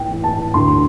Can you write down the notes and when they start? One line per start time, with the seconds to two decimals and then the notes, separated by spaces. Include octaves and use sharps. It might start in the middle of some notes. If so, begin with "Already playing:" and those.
Already playing: A2 G5
0.08 E3
0.24 A5
0.54 D2 C6